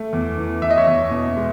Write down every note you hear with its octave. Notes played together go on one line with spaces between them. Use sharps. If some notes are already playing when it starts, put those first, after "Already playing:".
Already playing: A3
E2
E3
E3 E5
D#5
C#5 E5
E2
B2
G#3